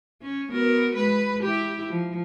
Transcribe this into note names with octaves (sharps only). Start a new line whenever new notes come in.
C#4
B3 F#4 A#4
G#3 B4
E4 G4
F3